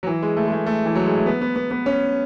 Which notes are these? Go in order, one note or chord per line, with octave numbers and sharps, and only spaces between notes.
F#3
E3
G#3
A3
G#3
A3
A3
E3
F#3
G#3
A3
B3
B3
B3
B3
C#4